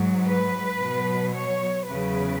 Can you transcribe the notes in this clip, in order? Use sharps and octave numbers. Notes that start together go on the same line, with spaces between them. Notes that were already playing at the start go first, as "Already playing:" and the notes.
Already playing: G#2 F#3
B4
B2 F#3
C#5
E2 C#3 F#3 B4